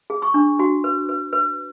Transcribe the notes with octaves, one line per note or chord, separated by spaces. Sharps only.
G#4
C#6
D4
F#4
B4
B4
B4